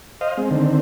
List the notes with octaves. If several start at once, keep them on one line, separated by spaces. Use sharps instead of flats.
C5 D#5 F5
G#3 C4
D3 D#3 C4